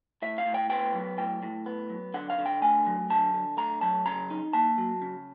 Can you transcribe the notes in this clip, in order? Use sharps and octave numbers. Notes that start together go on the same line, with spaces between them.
A2 E5
F5
A2
G5
B3 G5
F#3
A2 G5
A2
B3
F#3
D3 F#5
F5
D3
G5
A3 G#5
F#3
D3 A5
D3
A3 A#5
F#3 A5
C#3 A#5
D#4
A#3 A5
F#3
C#3